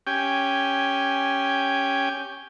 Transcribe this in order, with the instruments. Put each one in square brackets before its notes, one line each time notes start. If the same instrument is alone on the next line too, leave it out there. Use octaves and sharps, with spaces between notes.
[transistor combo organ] C#4 G4 G5 G#5